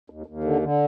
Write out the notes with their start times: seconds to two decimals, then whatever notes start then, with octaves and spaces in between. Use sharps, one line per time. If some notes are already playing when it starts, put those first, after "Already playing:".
0.10 D#2
0.26 D#2
0.44 D3
0.62 D3